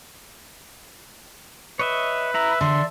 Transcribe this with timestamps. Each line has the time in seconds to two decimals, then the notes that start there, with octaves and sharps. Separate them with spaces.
1.79 B4 C#5 D#5 E5
2.34 E4 E5 A#5 B5
2.61 D3 D5 C6